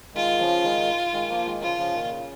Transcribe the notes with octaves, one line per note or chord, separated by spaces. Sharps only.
D#3 G#3 F4
C#3 F3
D#3 G#3
D#3 G#3
F3 A#3
D#3 G#3
C#3 F3 F4
C#3 F3
A#2 D#3
C#3